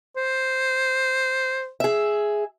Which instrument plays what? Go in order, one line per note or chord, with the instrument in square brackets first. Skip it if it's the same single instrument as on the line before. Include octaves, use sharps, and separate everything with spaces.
[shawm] C5
[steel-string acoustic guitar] G#4 E5